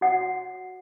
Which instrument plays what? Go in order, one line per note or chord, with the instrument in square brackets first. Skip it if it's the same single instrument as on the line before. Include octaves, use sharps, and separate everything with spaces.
[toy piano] F#4 C#5 F#5